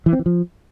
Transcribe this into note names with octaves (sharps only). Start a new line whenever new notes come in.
E3
C4
E3
F3